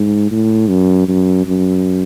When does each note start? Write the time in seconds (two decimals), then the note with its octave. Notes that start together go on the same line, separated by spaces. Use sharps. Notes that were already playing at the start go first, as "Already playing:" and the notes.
Already playing: G#2
0.31 A2
0.69 F#2
1.08 F#2
1.46 F#2